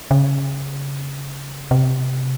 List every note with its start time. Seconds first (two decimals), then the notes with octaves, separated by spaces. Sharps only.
0.11 C#3
1.71 C3